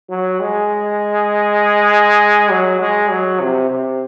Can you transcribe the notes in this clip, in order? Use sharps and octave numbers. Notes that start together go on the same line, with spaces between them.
F#3
G#3
F#3
G#3
F#3
C3
C3